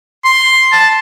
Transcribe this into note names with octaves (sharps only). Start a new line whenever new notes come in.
C6
A5